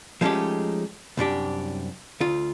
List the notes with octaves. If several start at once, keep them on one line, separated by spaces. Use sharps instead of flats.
F3 G#3 A3 C#4 D#4 G4
C2 F#2 D4 G4
D2 F4